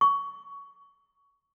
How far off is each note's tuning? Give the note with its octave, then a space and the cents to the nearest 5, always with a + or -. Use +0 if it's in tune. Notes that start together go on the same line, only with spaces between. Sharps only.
C#6 +15